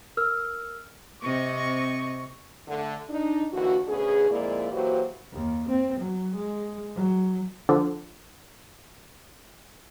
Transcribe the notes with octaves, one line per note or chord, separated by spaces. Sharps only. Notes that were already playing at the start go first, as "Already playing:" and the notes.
A#4 E6 F6
C3 C4 D#5 C#6
D3 A3
D4 D#4
D#2 D3 E3 F#4
D2 B2 C#4 G#4
F2 A#2 G#3 A#3 E4 D5
E3 F#3 A#3 F#4 G4 C5
D#2
C4
F#3
G#3
F#3
D3 F3